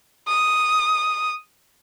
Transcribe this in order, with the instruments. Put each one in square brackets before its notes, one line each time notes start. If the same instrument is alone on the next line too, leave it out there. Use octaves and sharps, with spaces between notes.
[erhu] D#6